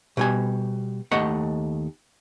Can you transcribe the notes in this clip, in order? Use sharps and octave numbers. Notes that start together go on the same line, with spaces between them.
B2 G3 G#5
D#2 A3 D#5 F#5